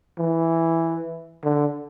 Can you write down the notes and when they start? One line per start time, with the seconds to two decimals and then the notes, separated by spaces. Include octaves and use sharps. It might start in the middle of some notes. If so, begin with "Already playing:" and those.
0.18 E3
1.44 D3